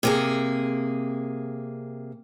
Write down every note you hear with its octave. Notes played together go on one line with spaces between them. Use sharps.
C3 A#3 G#4